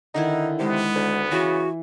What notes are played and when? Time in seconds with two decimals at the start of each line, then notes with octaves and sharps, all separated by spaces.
0.14 D3 D#3 D#4 E4
0.60 C3 G#3 B3
0.95 D2
1.32 C#3 E3 F#4